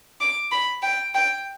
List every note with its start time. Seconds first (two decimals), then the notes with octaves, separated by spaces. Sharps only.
0.21 D6
0.52 B5
0.83 G5
1.14 G5